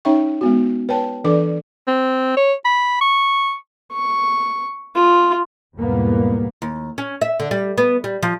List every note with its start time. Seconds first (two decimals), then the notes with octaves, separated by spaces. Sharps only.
0.05 C#4 D#4 C#5 E5 G5 C#6
0.41 G#3 B3 F#4
0.89 B4 C#5 G5 A5
1.24 E3 D4 A4 B4 D5 D6
1.88 C4
2.37 C#5
2.65 B5
3.01 C#6
3.93 C#6
4.95 F4
5.76 B1 E2 G#2 G3 A#3 B3
6.62 D#2
6.98 C#4
7.21 E5
7.40 D3
7.51 G3
7.78 B3
8.04 G3
8.23 F3